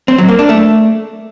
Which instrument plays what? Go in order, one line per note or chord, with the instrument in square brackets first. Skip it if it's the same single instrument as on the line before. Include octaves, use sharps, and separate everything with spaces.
[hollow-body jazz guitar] C4
F#3
A#3
D4
A3